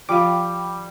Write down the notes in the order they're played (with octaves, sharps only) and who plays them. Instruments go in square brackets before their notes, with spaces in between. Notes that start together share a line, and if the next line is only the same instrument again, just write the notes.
[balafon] F3 F4 F5 [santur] G3 [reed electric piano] D6